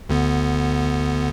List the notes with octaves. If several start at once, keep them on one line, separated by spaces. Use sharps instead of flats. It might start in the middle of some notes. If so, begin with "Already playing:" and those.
D2 D3 B3